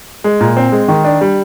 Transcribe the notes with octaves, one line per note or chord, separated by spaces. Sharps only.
G#3
A#2
C4
G#3
D#3
D4
G3